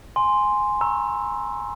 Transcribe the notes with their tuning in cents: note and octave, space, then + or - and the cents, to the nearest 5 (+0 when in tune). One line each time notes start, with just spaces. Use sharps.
G#5 +0 C6 +0
A#5 +25 C#6 -25 E6 +0